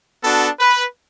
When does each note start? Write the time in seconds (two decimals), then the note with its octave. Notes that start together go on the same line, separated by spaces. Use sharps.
0.23 B3 D4 F#4 A4
0.60 B4